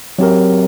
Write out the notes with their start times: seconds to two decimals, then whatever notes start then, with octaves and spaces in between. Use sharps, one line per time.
0.19 F#3 C4 G4 A#4